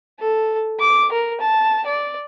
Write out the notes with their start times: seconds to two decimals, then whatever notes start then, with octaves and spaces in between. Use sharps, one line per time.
0.19 A4
0.79 D6
1.12 A#4
1.40 A5
1.86 D5